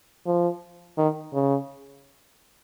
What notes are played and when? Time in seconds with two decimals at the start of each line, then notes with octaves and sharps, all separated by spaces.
0.26 F3
0.98 D#3
1.34 C#3